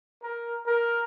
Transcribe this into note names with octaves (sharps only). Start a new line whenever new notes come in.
A#4
A#4